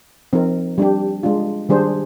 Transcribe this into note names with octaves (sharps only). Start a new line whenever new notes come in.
F3 C4 D#4 A#4
G3 D4 G4
G#3 D4 F4
D#3 G3 D4 G#4 C5